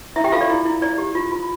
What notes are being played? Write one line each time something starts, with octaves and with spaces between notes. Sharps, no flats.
E4 E5
G4 G5
F4 A4 F5
D5
E4
E4
E4 D5
G4
F4
F4